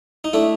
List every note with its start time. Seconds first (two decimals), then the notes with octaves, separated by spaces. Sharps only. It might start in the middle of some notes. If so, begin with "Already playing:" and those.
0.24 D#4
0.33 A3 D4 E4